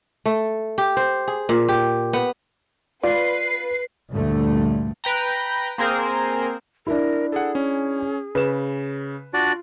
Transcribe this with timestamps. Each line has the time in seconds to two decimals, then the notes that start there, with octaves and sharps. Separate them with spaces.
0.26 A3
0.78 G4
0.97 C5
1.28 G#4
1.49 A#2
1.69 G4
2.13 B3
3.04 F4 B4 D5 C7
4.11 D2 G2 A#2 D3 A3
5.04 B4 G5 A#5
5.78 A#3 C4 G#4 A#4 C5
6.87 D4 E4 A#4
7.32 G#4 A4 F#5
7.55 C#4
8.35 C#3 B4 E7
9.33 D4 F4 F#4 D5